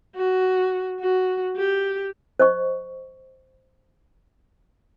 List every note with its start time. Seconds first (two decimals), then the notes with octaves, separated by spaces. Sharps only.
0.15 F#4
1.00 F#4
1.56 G4
2.39 C5 D#5 C#6